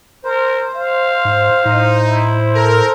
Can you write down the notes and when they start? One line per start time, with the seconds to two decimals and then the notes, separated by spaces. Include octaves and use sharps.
0.24 A#4 C5
0.76 F5
1.25 G#2
1.65 A2 D#4
2.07 E4
2.54 A4 A#4